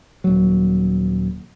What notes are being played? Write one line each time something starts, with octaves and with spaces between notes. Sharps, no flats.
D#1 F#3